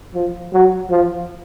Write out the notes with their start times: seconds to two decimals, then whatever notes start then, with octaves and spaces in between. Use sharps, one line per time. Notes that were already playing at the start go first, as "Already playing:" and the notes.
0.15 F3
0.53 F#3
0.90 F3